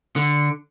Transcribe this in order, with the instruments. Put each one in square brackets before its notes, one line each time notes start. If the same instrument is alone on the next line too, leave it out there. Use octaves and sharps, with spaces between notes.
[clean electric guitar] D3